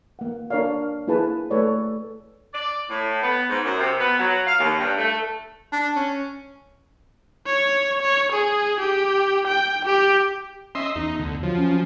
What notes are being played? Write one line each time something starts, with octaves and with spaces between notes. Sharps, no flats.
A#3 F#5
A#3 D4 A#4 C#5 D5 F5
A#3 E4 G#4 B4 A5
A3 A4 B4 C#5 D5
D5
A2
B3
G#2
F#2
C3
B3
F#3
F5
D#2
G2
A3
D4
C#4
C#5
C#5
G#4
G4
G5
G4
C#4 D#5 E5 C6
E2 D#4
D2
F3 F#3
C#4